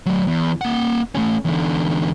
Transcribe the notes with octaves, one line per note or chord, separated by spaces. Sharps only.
F#3 A3
E2
A#3 F#5
A3 C#4
E2 D3